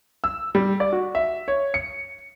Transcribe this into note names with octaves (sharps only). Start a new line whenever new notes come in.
E6
G3
D5
F#4
E5
C#5
C#7